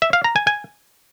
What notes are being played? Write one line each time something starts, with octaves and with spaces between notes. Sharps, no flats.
E5
F5
A#5
G#5
G#5